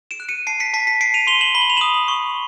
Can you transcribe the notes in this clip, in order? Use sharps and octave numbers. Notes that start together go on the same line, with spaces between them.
D7 E7
F#6
C#7 D#7
A5 C7 D7
B6 C#7
A5 B6 C#7
B6 C#7
A5 C7 D7
D#7 F7
C6 F7 G7
E7 F#7
B5 G7
F#7
F7
D#6 E7 F#7
C#6